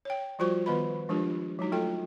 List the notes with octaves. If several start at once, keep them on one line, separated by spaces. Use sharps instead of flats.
C#5 G5
F3 G3 F4 F#4 C5 C#6
D#3 B3 B4 D#5 B5
F3 G#3 D4 F4 G4 A#4
F#3 G#3 D#4 F#4
A3 F4 A4 G5